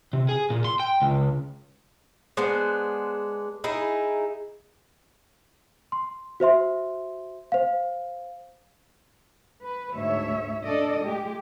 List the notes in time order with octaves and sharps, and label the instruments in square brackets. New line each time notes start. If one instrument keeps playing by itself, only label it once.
[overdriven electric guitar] C3
G#4
A#2
C6
G5
C#2
[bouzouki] G#3 B3 D4 C5
D#4 E4 G#4
[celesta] C6
F#4 C5 E5 C6
C5 F5
[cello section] B4
D2 G#2 C#5 E5
D4 A4 D5 D#5
G#3 A3 G4